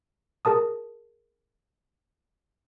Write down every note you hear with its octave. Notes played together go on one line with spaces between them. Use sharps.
G#4 A#4 A5 D#6